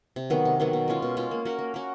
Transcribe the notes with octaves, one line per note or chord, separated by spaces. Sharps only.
C3
D#3 F#3 B3
C3
D#3 F#3 B3
B2
G#3 C#4 F4
B2
G#3 C#4 F4
A#3
C#4 F#4 A#4
A#3
C#4 F#4 A#4